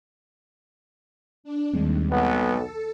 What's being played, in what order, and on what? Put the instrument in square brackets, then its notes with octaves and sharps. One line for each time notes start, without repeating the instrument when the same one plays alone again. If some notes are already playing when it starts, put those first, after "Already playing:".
[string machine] D4
[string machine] D#2 [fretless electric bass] G3 G#3 C4
[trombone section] B1 B3 [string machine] A4